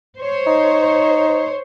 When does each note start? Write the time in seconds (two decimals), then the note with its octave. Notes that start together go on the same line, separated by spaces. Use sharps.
0.18 C5 C#5
0.47 D#4